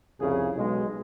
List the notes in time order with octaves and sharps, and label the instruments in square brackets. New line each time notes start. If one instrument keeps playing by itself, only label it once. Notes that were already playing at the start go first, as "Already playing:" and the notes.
[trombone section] C2 F2 C#3 G#4
B1 G#3